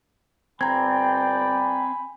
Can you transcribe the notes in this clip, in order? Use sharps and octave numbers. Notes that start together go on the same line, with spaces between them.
G1 C4 D5 G5 G#5 A#5 B5 G#6